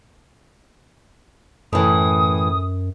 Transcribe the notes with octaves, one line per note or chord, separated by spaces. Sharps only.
F#2 A2 E3 D#6